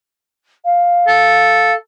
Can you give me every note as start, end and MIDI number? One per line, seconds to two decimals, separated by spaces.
0.65 1.74 77
1.08 1.73 69